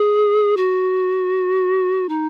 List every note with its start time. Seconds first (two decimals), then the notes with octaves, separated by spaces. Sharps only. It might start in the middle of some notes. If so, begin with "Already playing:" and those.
Already playing: G#4
0.57 F#4
2.09 D#4